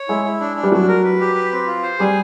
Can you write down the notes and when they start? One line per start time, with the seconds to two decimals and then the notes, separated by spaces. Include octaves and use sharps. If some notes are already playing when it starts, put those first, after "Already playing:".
Already playing: C#5
0.08 G#3 E4
0.25 E4
0.40 D4
0.56 D4
0.63 G3
0.72 F#3 D4
0.88 A#4
1.04 B4
1.20 G4
1.35 B4
1.52 C4
1.67 F4
1.83 C5
1.99 G3 G#4